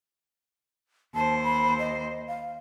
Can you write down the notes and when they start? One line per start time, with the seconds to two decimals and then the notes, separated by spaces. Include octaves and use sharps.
1.15 D#2 C5 A5
1.44 B5
1.79 D#5
2.28 F5